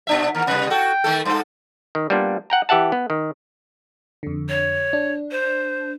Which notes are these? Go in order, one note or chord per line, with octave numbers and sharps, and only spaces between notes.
A#2 D4 E5
D#2 A#4
C3 G3 B4
F#4 A4 G5
D#3 A3 A4
G2 A4 C5
D#3
G3 A#3 B3 D4 F4
F#5 G5 A#5
E3 G4 E5 F#5 A5
B3
D#3
F2 D3
C#5
D4
C5